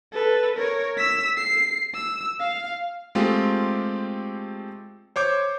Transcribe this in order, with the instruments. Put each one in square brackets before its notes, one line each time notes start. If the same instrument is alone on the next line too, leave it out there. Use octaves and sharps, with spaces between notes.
[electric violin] A4 B4
A#4 C#5
E6 B6
C7
E6
F5
[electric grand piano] G#3 A3 C4 F4 G4
C5 C#5 D6 G6